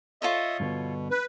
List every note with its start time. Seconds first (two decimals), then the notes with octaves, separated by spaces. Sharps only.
0.22 F4 A4 C#5 D#5 E5 D#6
0.60 G2 B2 D3 B3
1.11 B4